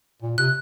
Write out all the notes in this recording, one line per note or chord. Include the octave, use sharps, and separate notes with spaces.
A#2
C3 F#6